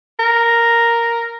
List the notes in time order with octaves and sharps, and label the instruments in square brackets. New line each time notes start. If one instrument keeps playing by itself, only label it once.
[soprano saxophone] A#4